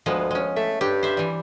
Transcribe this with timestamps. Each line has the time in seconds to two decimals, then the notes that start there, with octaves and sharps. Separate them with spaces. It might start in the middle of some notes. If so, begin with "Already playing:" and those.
0.06 D2 F3 G#3 B3
0.31 G#3 C#4
0.56 A3 E5
0.81 G2 G4
1.03 C5 E5
1.17 E3 G3